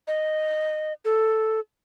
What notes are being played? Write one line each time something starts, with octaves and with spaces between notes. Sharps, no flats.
D#5
A4